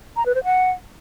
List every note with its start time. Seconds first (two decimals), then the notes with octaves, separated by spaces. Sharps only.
0.16 A#5
0.26 B4
0.35 C5
0.44 F#5